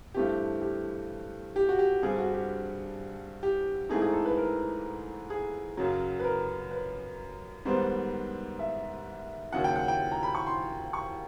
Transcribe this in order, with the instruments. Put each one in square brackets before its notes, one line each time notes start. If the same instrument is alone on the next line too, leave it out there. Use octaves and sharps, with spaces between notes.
[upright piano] G2 E3 A3 C4 G4
G4
G4
F#4
G4
G2 D3 G3 C4 G#4
F#4
G4
G4
G#2 E3 A3 C4 D#4 G#4
G#4
A4
B4
A#4
G#4
F#2 C#3 F#3
B4
A#4
B4
G#2 D#3 G3 B3 C5
E5
D#2 C#3 F#3 F#5
G5
F#5
G5
A#5
B5
C#6
C6
C#6